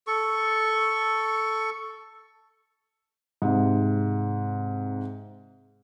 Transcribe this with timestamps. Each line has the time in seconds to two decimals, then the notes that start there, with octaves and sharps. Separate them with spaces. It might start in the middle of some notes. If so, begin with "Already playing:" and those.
0.07 A4 C#6
3.42 G#2 C3